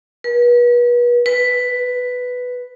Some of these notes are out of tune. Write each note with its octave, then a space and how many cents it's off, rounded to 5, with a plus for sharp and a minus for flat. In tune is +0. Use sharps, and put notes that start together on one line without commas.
B4 -35
B4 +5